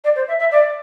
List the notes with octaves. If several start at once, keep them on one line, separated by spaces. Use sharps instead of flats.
D5
C5
E5
E5
D5